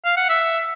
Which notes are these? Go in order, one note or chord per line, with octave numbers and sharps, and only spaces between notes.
F5
F#5
E5